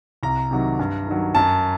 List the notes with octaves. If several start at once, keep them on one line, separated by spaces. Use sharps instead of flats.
C2 A#5
C3 D#3 F#3
G2
D#3 F#3
F#2 A5